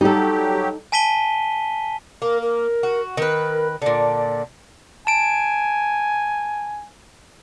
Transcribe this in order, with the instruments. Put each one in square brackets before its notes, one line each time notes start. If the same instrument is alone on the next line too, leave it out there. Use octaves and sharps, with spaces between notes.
[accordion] F#3 G4 [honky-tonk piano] G3 [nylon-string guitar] D#4 A4
[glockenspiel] G#5 A5 B6 D#7 G7
[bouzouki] A#3 [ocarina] A#4
[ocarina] A#4
[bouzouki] F#4
[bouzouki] D#3 B4 [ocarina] A#4
[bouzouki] A#2 D3 [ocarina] D5
[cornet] G#5 [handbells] A5 D7